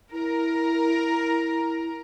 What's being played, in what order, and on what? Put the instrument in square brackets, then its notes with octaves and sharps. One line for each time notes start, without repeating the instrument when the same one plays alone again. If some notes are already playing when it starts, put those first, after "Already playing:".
[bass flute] E4 [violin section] A#4